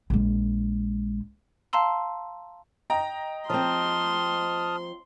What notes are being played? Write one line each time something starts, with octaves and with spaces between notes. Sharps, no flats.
A#1 G#3
F5 A5 A#5 C6 E6
D#5 G5 A#5
F3 C4 A5 C6 D#6 F6